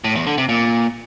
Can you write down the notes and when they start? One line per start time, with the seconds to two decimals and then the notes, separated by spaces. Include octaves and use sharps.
0.04 A2
0.15 E2
0.27 D3
0.38 C3
0.49 A#2